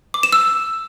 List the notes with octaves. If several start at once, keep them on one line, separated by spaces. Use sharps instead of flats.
D6
E7
E6